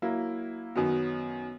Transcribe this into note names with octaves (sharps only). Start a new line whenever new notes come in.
F#3 A#3 E4
F#2 D#3 F#3 B3